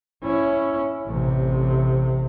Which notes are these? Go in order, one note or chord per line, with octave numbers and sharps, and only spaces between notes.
C#4 E4
A1 C3